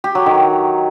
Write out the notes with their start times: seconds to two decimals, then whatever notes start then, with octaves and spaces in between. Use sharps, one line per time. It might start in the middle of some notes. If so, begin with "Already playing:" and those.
0.04 G4
0.15 F#3
0.26 D#3